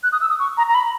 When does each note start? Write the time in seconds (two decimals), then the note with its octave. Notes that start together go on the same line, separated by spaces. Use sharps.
0.03 F#6
0.12 D#6
0.21 E6
0.30 D#6
0.39 C#6
0.57 A#5
0.68 A#5
0.75 B5